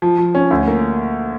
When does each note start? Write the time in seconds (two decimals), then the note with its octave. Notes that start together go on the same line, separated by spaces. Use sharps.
0.02 F3
0.18 F3
0.35 C#4
0.51 D2
0.67 A#3